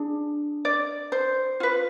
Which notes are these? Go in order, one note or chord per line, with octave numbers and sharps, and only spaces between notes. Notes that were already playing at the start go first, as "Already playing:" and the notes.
Already playing: D4 G#4
D5
C5
F4 B4